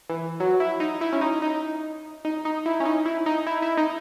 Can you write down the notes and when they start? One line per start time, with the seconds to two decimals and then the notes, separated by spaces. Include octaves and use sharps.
0.10 E3
0.40 F#3
0.60 E4
0.80 D#4
1.01 E4
1.13 C#4
1.21 D#4
1.42 D#4
2.25 D#4
2.45 D#4
2.66 E4
2.80 C#4
2.86 D#4
3.06 E4
3.26 D#4
3.46 E4
3.62 E4
3.77 D#4